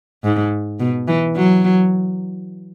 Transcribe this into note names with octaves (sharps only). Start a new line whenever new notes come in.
G#2
B2
E3
F#3